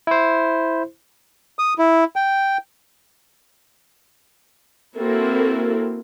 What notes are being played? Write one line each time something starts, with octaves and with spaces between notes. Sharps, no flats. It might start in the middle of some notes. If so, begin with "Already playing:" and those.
E4 C5
D#6
E4
G5
A#3 C4 E4 F#4 A4 A#4